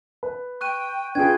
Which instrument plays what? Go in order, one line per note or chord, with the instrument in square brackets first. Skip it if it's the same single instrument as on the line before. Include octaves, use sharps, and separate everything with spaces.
[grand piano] B4
[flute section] G5 [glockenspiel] C#6 F#6 D#7
[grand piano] D4 F4 G#4 [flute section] B4 G5 [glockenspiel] G#6